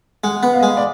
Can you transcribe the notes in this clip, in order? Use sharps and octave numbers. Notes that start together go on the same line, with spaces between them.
G#3 F#5
B3
F5
D#5
G#3
F5
D5